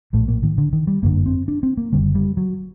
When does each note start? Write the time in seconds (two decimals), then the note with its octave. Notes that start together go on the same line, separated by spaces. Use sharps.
0.13 A#1 A2 A3
0.28 A#3
0.43 D#3
0.58 D3
0.73 D#3
0.87 G3
1.02 G1 F#2 D3 A#3
1.26 C4
1.48 D4
1.63 C4
1.77 A#3
1.92 F#1 F#2 D3 G3
2.15 G3
2.37 F#3